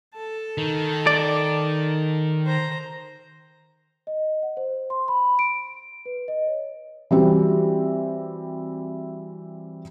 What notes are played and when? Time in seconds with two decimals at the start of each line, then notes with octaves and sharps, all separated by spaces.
0.15 A4 A5
0.58 D#3
1.07 D5
2.46 C5 A#5
4.07 D#5
4.43 F#5
4.57 C5
4.90 C6
5.08 B5
5.39 D7
6.06 B4
6.28 D#5
6.47 C#5
7.11 E3 G3 C4 F#4